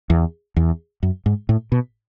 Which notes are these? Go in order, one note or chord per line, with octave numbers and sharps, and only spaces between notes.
E2
E2
F#2
G#2
A2
B2